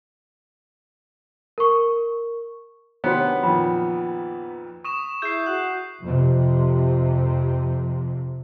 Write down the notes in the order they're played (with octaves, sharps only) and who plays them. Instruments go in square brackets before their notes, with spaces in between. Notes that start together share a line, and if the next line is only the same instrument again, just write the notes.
[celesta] A#4 C#6
[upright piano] C3 D#3 D4 [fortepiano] B3 [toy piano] F#4 C5 C#5
[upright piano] F2 A#2 D#3 [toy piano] B5
[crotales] C#6 D#6 E7
[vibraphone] E4 G#4 E5 [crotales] G6 C7
[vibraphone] F#4 F#5
[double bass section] F2 C3